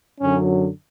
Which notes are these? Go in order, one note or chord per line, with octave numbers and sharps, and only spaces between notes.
F#2 D3 F#3 C#4